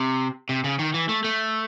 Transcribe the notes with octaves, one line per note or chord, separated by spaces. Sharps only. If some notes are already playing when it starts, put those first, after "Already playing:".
Already playing: C3
C3
C#3
D#3
E3
A3
A3